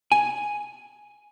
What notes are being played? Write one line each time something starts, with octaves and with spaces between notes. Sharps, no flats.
G#5